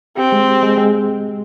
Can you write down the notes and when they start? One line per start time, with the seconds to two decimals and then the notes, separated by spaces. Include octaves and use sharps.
0.17 C4 G4
0.32 G#3
0.47 G4
0.62 G#3
0.77 G#3